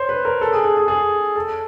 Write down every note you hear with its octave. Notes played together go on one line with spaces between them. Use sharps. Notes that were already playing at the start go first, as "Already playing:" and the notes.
Already playing: C5 C#5
B4
A#4
A4
G#4
G#4
G#4
G#4
A4